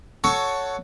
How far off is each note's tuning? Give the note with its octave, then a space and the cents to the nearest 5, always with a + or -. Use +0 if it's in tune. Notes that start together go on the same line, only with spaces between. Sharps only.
F#4 +0 A4 +0 C#5 +10